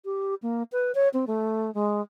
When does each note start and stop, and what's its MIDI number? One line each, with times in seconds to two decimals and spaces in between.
0.05 0.35 67
0.42 0.63 58
0.72 0.92 71
0.95 1.09 73
1.13 1.25 60
1.27 1.73 57
1.74 2.02 56